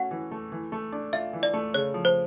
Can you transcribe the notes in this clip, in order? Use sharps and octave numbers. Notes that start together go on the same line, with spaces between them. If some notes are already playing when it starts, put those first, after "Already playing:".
Already playing: A3 C#4 F#4 F#5
E3
A3
E3
A3
D4
F4 E5
E3
D5
A3
C#3 C#5
F3
C5